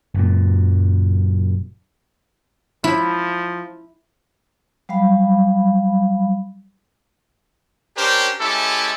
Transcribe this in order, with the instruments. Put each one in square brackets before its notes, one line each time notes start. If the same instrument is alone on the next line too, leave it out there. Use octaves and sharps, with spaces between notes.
[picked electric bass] F#1 F#2 A#2
[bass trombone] F3 [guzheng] E4
[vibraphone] F#3 G3 F5 B5
[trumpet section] C#4 D4 G4 A#4 C5
G#3 C#4 E4 G4 A4